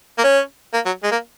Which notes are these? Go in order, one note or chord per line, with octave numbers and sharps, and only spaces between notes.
A#3
C#4
A#3
F#3
G#3
A#3